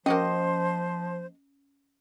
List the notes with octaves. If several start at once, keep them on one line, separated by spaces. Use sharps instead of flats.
F3 A#3 C#4 F#4 C5 D#5